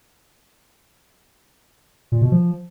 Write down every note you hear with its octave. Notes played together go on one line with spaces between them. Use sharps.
A#2
B2
F3